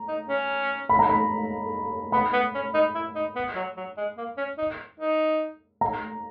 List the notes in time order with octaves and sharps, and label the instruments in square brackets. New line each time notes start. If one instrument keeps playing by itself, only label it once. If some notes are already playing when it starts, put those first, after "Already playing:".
Already playing: [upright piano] A#5
[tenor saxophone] D#4
C#4
[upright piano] B5
A#5
B5
[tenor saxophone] B3 [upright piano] B5
[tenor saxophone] B3
C#4
D#4
E4
D#4
B3
F#3
F#3
G#3
A#3
C#4
D#4
D#4
[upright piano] A#5